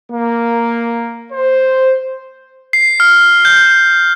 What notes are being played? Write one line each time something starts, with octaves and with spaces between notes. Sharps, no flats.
A#3
C5
C7
F6
G6